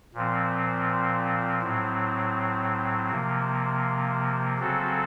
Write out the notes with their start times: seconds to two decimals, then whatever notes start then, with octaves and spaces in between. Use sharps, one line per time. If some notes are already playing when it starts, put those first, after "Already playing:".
0.14 A#2 F3 C4
1.63 A2 F#3 C4
3.11 C3 F3 A#3
4.58 C#3 F#3 C4 F#4 A4